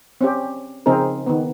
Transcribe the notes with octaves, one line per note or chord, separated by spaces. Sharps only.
C4 C#4 G4
C#3 F3 C4 D#4 G#4 A#4
D#3 B3